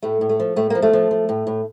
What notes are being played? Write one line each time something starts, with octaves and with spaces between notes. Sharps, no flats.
A2 A3
A2
A3
F3
A2 A3
F3 A#3
A3
F3
F3
A2
A2